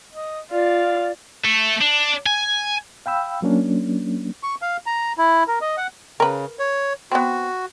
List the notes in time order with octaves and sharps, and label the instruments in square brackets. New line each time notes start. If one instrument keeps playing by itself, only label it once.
[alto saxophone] D#5
[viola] F4 [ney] D5 [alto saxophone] F5
[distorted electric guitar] A3
D4
G#5
[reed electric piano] F5 G5 B5 E6
F#3 A#3 C#4 D4
[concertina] C#6
F5
A#5
E4
A#4
D#5
F#5
[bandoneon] C#3 [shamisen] A#4 B4
[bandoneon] C#5
[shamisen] B3 C4 [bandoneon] F#4